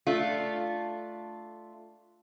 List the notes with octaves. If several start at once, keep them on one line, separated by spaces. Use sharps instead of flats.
A3 D4 F4